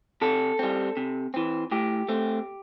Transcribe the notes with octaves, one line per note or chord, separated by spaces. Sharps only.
C3 A4
G3 C4
C3
E3 C4
A2 G4
A3 C4